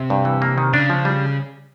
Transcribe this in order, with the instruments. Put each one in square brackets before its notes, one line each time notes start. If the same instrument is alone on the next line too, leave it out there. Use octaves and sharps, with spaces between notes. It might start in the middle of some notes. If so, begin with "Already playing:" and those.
Already playing: [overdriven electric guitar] C3
[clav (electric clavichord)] G2
E3
A#3
D#3
[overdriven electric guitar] C#3 [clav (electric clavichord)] D4
[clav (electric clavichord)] F3
G3